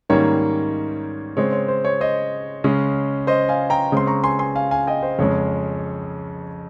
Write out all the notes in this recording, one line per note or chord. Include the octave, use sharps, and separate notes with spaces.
G#2 D#3 G3 A#3 C#4 C#5
C#3 G#3 C4 C#5
C#5
C5
C#5
C5 D#5
C#3 G#3 C#4
C5 D#5
F5 G#5
G5 A#5
C#3 G#3 C4 C6
A#5 C#6
G#5 C6
G#5 C6
F5 G#5
F5 G#5
D#5 G5
C5
F2 C#3 G#3 C#4 C#5